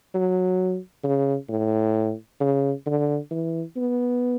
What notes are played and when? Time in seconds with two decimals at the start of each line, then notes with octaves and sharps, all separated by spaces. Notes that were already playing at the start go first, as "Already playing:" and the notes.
0.14 F#3
1.04 C#3
1.49 A2
2.40 C#3
2.86 D3
3.31 E3
3.76 B3